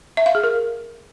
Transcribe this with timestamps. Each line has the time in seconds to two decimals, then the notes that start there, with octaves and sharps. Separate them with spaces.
0.17 E5
0.26 F5
0.35 G#4
0.44 A#4